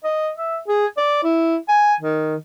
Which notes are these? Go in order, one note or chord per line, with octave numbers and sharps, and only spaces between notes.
D#5
E5
G#4
D5
E4
G#5
D#3